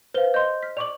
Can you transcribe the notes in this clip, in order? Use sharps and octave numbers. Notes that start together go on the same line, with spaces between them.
B4 C5 F5 G7
D#5 C6 G6
F6 B6
D5 C#6 D6 F7 F#7